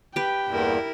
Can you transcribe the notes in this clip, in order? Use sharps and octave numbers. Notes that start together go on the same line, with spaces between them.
G4 B4 G5
E2 G2 A#2 E4 A#4